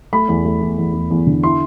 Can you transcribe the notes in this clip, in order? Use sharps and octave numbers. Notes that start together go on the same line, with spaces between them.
A3 B5
E2
A3
E2
E2
E2
E2
D3
E4 C6